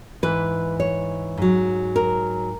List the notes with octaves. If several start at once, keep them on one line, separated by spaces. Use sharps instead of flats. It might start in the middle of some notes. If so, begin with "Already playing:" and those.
G#2 E3 B4
C#5
G#2 F#3
A#4